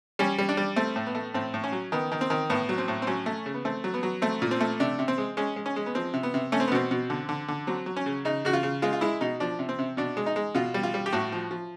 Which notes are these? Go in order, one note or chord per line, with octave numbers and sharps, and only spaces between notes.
G3 C#4
G3
D4
G3
A3 C4
A2
B3
A3
A2 C4
A2
C#4
F#3
D#3 B3
D#3
C4
D#3
A2 B3
F#3
C4
A2
C4
F#3 C#4
A3
C#3
B3
A3 C4
F#3
B3
F#3
A3 C4
A#2
C4
A3
C3 D4
C3
C4
G#3
G#3 C#4
G#3
C#4
G#3
B3
F3 C4
C3
B3
C3
A3 C#4
C4
B3
B2 C4
B2
D3
D3
D3
F#3 C4
F#3
C#4
C#3
C#3 D#4
C#3 F#4
F4
C#3
G#3 F4
F4
G#3 E4
B2 D#4
F3 D4
C3
C4
C3
B2 D4
G#3
D#4
G#3
B2 F4
G3
F4
G3
G4
A2 F#4
F3
F3